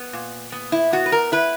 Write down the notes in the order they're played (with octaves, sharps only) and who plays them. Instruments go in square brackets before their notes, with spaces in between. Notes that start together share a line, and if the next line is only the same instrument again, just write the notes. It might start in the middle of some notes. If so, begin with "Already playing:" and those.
Already playing: [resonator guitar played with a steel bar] B3
A#2
B3
E4
B3 F#4
B4
A#4
E4 B4